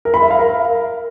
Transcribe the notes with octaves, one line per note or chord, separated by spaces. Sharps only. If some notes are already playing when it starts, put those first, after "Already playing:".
A#4
B5
E5
F5
A#4